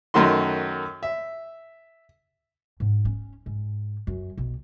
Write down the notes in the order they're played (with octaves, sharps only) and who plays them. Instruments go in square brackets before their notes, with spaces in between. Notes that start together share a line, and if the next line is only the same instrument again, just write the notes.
[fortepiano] F#2 D#3 A3 F#4 C6
E5
[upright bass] G#2
C#4
G#2
F#2
B1